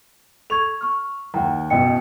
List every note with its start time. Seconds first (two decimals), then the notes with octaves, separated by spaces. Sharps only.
0.50 A4 C#6 G#6 F7
0.81 C#6 F6
1.34 D#2 D#3 F#5 G5 A#5
1.70 A1 B2 D#5 G5 C#7